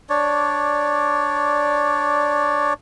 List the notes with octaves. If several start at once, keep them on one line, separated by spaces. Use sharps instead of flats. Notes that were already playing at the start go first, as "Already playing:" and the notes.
D4 C#5 D5